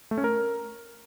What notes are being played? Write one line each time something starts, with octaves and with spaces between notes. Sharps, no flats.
A3
C#4
A#4